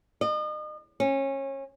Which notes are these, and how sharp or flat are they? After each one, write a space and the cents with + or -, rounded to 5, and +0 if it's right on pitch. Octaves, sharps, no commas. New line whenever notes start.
D#5 -40
C#4 -25